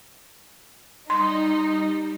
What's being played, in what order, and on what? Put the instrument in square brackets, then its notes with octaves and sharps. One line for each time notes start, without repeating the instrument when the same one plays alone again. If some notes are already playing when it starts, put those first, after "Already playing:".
[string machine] G3 [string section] D#4 [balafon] C6